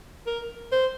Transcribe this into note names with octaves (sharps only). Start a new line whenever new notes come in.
A#4
C5